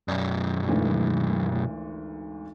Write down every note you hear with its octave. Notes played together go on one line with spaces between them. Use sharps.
B1 F#2 D5
G#1 D2 E3